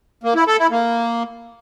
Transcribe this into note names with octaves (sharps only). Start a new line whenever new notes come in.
A#3
E4
A4
E4
A#3